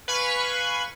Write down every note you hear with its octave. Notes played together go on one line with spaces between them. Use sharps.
B4 F5 G#5 B5 C#6